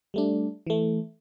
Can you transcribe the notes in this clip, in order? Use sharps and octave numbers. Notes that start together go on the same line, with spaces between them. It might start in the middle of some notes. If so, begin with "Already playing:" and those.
G3 A3 D4
E3 A3